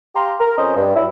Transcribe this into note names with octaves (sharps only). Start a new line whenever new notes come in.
G4 F5 A#5 C6
A#4
F2 C#4 C5 D#5
G2
F#3 E4